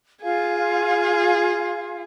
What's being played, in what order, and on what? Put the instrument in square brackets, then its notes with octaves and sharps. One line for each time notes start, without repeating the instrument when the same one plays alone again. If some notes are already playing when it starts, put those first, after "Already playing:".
[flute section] F4 F5 [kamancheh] G#4